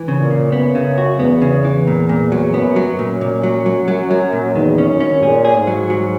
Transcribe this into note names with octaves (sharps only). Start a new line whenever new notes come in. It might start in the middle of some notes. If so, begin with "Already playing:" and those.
Already playing: E3
C#3
A#2
C#3
F#2 B3
C#3
F#4
E2 B3
C#3
E3
A#2
A#2
F#3
F#2 B3
F#3
F#2
A#2
A#2
F#3
F#3
F#3
F#3
A#2
E2 D#3
C#4
F#2
C#4
A#2 G#4
G#4
G#2
F#3
F#3